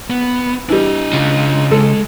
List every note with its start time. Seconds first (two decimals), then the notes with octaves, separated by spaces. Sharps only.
0.10 B3
0.69 E3 G3 D4 D#5
1.13 C#3 F4
1.71 G#3 A4